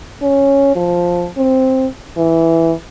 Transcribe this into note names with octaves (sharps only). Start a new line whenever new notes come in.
C#4
F3
C4
E3